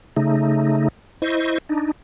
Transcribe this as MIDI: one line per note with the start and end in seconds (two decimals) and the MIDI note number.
0.17 0.88 49
0.17 0.88 57
0.17 0.88 63
1.22 1.58 64
1.22 1.58 72
1.22 1.58 75
1.22 1.58 85
1.69 1.92 62
1.69 1.92 63